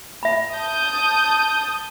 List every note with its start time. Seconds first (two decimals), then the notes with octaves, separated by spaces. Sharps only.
0.23 E5 B5
0.54 A5 D#6 G6